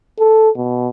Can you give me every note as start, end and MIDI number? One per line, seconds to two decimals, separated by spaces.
0.20 0.50 69
0.56 0.88 47